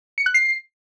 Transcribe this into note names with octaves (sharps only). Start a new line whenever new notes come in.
C#7
F#6
C7